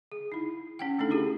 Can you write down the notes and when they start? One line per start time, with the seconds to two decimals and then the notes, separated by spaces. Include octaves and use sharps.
0.12 G#4
0.32 D#4 E4
0.79 C#4 F#5 G5
0.99 A3 D4 D#4 A4
1.10 D4 E4 G4 G#4